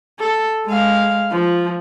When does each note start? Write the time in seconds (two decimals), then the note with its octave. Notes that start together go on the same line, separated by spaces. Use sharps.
0.19 A4
0.66 G#3 F5
1.31 F3